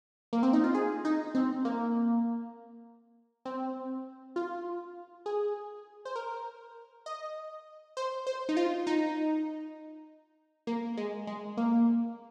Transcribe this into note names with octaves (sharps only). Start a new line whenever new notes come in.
A#3
C4
D#4
F4
G#4
D#4
C4
A#3
C4
F4
G#4
C5
A#4
D#5
C5
C5
D#4
F4
D#4
A#3
G#3
G#3
A#3